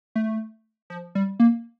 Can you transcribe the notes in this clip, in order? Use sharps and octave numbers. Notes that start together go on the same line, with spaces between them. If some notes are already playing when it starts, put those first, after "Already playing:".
A3
F3
G3
A#3